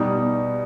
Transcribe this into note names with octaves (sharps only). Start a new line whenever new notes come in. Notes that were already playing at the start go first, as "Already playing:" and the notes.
Already playing: B2 G3 D#4